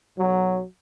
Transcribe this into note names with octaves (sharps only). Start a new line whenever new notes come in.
B1 F#3